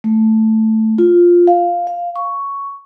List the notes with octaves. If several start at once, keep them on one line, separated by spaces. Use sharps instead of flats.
A3
F4
F5
F5
C#6